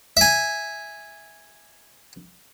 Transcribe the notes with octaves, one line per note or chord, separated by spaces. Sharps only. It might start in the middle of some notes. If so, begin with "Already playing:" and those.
E5 G#5